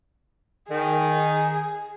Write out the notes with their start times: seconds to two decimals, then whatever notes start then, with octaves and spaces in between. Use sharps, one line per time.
0.71 D#3 G#4